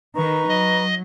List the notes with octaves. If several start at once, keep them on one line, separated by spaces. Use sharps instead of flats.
D#3 D#4 B4 A#5 C#6
F#3 D#5